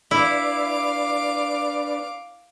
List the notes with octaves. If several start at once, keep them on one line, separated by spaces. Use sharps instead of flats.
D4 E4 B4 D5 F5 D6